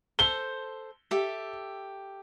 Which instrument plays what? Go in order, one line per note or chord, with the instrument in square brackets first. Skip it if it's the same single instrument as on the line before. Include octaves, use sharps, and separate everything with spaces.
[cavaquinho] A4 C5 [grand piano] G7
[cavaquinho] G4 A4 E5